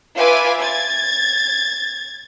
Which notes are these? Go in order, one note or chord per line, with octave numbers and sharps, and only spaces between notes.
F4 B4 E5 G#5 D6
G#6 A6